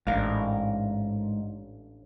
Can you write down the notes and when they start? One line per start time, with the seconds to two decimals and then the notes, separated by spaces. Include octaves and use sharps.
0.07 A1 G#2 D4 A#4 F5